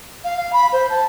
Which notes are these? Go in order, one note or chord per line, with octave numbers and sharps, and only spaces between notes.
F5
F5
B5
C5
A5